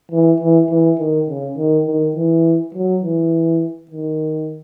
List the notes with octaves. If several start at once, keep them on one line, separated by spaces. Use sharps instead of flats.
E3
E3
E3
D#3
C#3
D#3
D#3
E3
F#3
E3
D#3